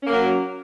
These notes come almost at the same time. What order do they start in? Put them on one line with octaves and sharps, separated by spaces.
C#4 A#3 A#4 F#3